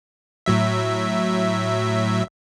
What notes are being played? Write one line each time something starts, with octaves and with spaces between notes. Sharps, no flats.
A2 F#3 E5